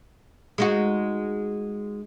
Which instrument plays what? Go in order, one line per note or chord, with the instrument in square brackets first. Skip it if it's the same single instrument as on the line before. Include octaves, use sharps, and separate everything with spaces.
[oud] G#3 D#4 F#4